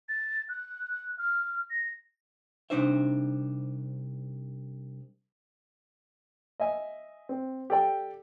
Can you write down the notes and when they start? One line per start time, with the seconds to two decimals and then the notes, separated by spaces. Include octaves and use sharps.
0.09 A6
0.49 F#6
1.18 F6
1.70 A#6
2.70 C2 F2 D4 D#4 C5 E5
6.60 D#5 E5 G#5
7.29 C4
7.70 G4 A4 D5 G5